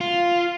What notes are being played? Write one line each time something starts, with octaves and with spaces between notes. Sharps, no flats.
F4